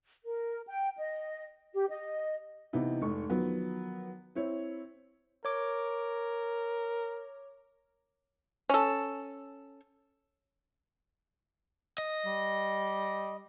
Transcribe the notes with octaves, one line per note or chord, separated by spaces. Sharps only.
A#4
G5
D#5
G4
D#5
C3 E3 B3 D#4 E4
F1 G#2 C#6
D#3 F3 F#3 B3
C4 E4 C#5
A#4 C#5 D6
C#4 A4
D#5
G3